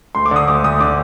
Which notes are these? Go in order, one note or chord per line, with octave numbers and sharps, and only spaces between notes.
D2 C6
D6
D3 D#6
D2 D6
D2 D#6
D3 D6